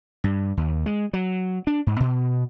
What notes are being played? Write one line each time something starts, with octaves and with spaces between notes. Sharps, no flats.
G2
D#2
G#3
F#3
D4
G#2
B2